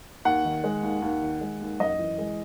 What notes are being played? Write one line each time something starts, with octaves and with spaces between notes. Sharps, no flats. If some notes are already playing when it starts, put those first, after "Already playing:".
D#2 F#5
D#3
G#3
D#2
D#2
D#3
G#3
D#2
F#2 D#5
E3
G#3